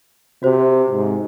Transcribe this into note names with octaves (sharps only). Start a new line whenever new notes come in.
C3 F#4 C5
G#2